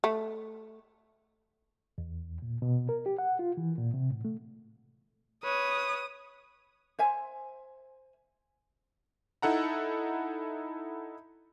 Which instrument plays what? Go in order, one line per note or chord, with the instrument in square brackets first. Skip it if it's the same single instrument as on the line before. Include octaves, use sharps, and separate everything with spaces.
[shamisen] A3
[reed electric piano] E2
A#2
B2
A#4
G4
F#5
F4
E3
A#2
C3
A2
A3
[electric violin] B4 C#5 [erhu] D#6
[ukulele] C5 E5 G#5
[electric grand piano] D#4 E4 A4 F#5 A#5